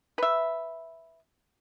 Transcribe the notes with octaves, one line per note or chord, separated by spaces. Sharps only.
B4 E5